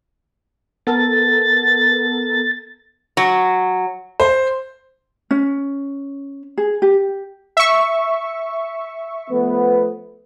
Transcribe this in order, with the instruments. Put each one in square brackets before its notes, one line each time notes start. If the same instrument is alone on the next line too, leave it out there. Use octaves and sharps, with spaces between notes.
[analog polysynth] B3 A4 A#4 [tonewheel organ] A6
[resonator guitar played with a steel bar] F#3
[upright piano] C5
[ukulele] C#4
G#4
G4
[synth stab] E5 C#6
[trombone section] F3 A3 B3